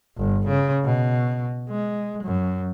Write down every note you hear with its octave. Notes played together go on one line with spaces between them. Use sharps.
G1
C#3
B2
G#3
F#2